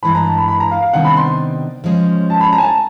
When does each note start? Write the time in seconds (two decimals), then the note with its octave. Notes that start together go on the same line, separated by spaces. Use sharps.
0.03 G2 E3 G#3 B5
0.15 A#5
0.26 A5
0.38 B5
0.48 B5
0.60 A#5
0.71 F5
0.82 F5
0.93 C3 D#3 G3 B3 D4 F#5
1.05 B5
1.17 C6
1.84 F3 G#3 C#4
2.30 A5
2.41 B5
2.53 A#5
2.58 G#5
2.63 A5